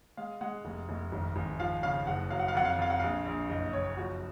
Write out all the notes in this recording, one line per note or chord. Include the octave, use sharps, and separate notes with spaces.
G#3 F5
G#3 F#5
F1
F1
G#1
G#1
F3 F5
C#3 F5
F#1 F#5
F#3 F5
F#5
F5
F2 F#5
F5
F#5
F2 F5
F#5
A#1 F5
A#1
F#1 D#5
F#1 C#5
F3 F#4